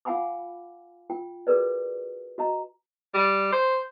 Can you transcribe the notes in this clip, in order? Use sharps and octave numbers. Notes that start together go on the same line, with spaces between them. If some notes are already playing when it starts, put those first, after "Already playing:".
F4 F5 F#5 G#5 B5 D6
F4 G5
F#4 G#4 A#4 B4 D5
F#4 D#5 A#5
G3
C5